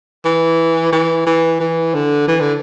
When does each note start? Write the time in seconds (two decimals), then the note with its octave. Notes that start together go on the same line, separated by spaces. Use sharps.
0.25 E3
0.92 E3
1.26 E3
1.60 E3
1.94 D3
2.28 E3
2.40 D3